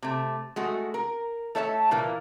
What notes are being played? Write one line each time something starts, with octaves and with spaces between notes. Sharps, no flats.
C3 A3
G#3 A3 F#4
A#4
A3 A4 C#5 E5 F#5 A5
A#2 E3 A#3